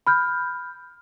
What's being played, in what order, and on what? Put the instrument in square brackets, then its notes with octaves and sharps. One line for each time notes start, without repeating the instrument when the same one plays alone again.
[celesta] B5 F6 G6